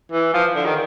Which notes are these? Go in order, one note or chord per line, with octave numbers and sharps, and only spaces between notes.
E3
F3
D3
D#3